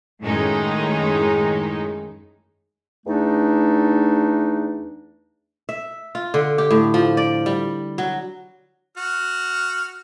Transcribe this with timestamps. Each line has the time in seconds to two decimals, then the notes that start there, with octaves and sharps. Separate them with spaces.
0.22 F#2 A2 D#3 G#3 C#4 D#4
3.07 E2 A3 D4 D#4
5.69 E5
6.15 F4
6.34 D3
6.58 G4
6.71 A2
6.94 F3
7.17 D5
7.46 G3
7.98 F#3
8.97 F#4 F6